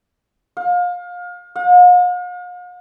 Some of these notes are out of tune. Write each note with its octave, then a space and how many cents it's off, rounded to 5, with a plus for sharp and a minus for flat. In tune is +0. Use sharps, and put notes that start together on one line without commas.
F5 +30
F5 +45